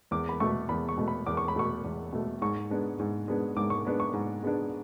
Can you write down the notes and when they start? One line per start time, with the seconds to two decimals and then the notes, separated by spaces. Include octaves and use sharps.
0.11 E2 D6
0.29 B5
0.40 B2 A3 C#6
0.69 E2 B5
0.89 C#6
0.98 B2 A3
1.08 B5
1.26 E2 D6
1.37 C#6
1.48 B5
1.56 B2 A3 C#6
1.84 E2
2.13 B2 A3
2.42 G#2 C#6
2.70 G#3 B3 D4
2.99 G#2
3.28 G#3 B3 D4
3.57 G#2 D6
3.70 C#6
3.85 G#3 B3 D4
4.00 C#6
4.13 G#2
4.43 G#3 B3 D4